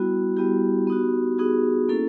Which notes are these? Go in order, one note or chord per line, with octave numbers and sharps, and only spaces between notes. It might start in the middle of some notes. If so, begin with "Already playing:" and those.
Already playing: G3 B3 E4 F#4
G3 B3 E4 G4
B3 D#4 F#4
B3 D#4 F#4 G#4
A#3 C#4 E4 A4